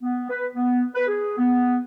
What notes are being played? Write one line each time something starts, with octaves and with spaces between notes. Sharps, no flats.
B3
B4
B3
B4
G#4
B3